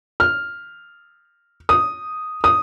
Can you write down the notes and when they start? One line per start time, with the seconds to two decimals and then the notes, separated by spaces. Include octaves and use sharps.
0.20 F6
1.69 D#6
2.44 D#6